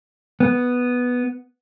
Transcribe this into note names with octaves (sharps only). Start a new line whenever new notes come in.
B3